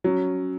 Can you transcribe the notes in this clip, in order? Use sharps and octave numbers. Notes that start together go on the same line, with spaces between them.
F#3 C#4